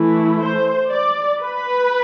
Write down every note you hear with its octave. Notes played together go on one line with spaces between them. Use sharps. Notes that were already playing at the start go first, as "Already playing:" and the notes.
Already playing: E3 A3 E4
C5
D5
B4